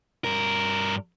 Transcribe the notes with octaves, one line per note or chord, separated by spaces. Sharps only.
G2 A#4